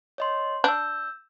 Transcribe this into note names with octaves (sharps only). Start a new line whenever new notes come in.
C#5 D#5 C6
D4 E6 G6